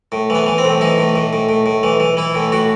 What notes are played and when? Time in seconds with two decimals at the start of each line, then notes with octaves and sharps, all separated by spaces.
0.12 A2
0.30 E3 B3
0.46 E3
0.58 C4
0.64 A2
0.81 E3 D#4
0.98 A2
1.16 A2
1.33 A2
1.49 A2
1.66 A2
1.83 E3
2.00 E3
2.17 E3 E4
2.35 A2
2.52 A2 F#4